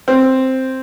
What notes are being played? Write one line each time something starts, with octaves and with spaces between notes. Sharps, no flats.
C4